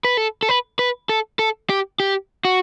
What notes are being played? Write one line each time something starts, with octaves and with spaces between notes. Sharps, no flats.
B4
A4
A4
B4
B4
A4
A4
G4
G4
F#4